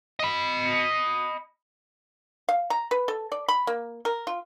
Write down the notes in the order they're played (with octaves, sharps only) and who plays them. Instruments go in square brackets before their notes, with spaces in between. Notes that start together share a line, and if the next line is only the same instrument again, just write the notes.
[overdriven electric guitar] D#5 B5
[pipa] F5
A#5
B4
A4
D5
B5
A#3
A#4
F4